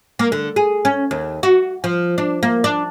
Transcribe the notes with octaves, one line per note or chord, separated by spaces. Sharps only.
A#3
D3
G#4
C#4
D#2
F#4
F3
D4
A#3
D4